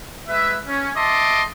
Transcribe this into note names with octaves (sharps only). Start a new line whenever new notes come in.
G#3 B4 E5
C#4
D#5 E5 A5 C6 D6